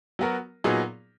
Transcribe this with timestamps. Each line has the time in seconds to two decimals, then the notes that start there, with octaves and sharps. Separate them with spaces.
0.19 F#3 B3 F#4 A#4
0.64 A#2 F#3 B3 D#4 G#4